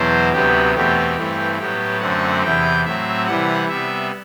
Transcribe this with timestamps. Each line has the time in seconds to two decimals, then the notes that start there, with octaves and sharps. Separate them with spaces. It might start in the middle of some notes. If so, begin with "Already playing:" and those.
Already playing: E2 B2 F#3 C5
0.32 D2 C3 F#3 B3 G4
0.75 E2 B2 A3 C4 G4
1.16 G2 E3 A3 C4
1.59 A2 F#3 B3 G4
2.01 F#2 D3 A3 C4 F#5
2.43 E2 C3 E3 G5
2.85 A2 F#3 C4 E5
3.27 C3 E3 G3 F#5
3.69 C3 G3 B3 E5